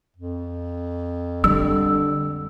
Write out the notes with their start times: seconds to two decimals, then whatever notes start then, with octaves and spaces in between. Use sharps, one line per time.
0.16 F2
1.44 D3 G3 E6